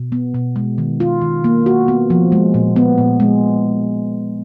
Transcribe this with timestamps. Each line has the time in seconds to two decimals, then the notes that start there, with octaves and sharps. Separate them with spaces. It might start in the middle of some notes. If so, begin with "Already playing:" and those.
Already playing: B2
0.12 B3
0.34 B2
0.56 G#3
0.78 D#3
1.00 F4
1.22 D#3
1.44 A#3
1.66 F#4
1.88 B3
2.10 F3
2.32 G#3
2.54 A#2
2.76 B3
2.98 A#2
3.20 G#3